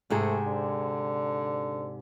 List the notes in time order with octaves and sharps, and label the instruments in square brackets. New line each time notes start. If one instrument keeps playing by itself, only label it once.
[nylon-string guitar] G#2 C3 G#4 [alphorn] A3
[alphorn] D3